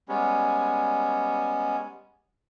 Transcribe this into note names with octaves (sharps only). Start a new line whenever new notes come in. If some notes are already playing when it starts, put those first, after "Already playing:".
G3 G#3 B3 C#4